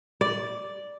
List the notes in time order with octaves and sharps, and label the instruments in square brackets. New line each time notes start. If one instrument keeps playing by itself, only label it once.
[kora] D5